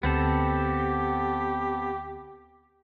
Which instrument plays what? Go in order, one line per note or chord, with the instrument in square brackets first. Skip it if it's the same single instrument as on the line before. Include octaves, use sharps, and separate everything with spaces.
[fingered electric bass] D2 [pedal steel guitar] B3 C4 A4 [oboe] G4